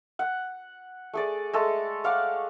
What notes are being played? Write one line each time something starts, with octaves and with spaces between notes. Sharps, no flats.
F#5
A3 G#4 D5
G#3 A3 A4
C#5 F5 F#5 D6